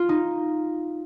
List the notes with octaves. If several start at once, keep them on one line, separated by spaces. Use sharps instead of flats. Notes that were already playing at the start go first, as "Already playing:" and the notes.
Already playing: F4
D#4